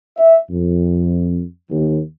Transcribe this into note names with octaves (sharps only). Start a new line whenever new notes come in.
E5
F2
D#2